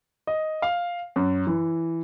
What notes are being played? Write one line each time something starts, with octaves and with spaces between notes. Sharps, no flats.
D#5
F5
F#2
E3